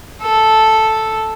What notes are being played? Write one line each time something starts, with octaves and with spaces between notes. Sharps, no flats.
A4